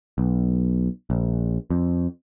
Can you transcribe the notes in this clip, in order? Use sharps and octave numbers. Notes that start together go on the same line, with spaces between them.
B1
A#1
F2